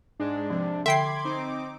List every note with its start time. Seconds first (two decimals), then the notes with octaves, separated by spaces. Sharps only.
0.20 G#2 G#3 D4
0.50 C3 F3
0.86 D3 E5 G5 B5 C6 D6 G#6 C7
1.24 C4 D#4 D6